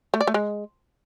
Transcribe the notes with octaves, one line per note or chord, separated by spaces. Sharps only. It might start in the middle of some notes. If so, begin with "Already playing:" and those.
A3
D5
A3
G#3